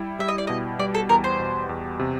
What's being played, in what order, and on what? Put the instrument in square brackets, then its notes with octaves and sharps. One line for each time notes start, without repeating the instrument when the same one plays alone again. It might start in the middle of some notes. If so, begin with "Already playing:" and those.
Already playing: [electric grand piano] G3 E4
[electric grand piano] G3 [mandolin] E5
[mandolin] D#5
D5
[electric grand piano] B2 [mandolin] D#5
[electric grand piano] G3 [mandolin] D5
[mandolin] A4
[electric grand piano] E2 [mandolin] A#4
[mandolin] C5
[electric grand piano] B2
E2
C3